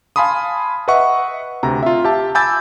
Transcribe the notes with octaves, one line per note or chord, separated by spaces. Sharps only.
F5 G#5 A5 B5 C6 D#6
B4 D#5 E5 F#5 C#6
D2 C3 A#5
F4 E5
G4 E5 A5
G#5 B5 D6 E6 G6 A6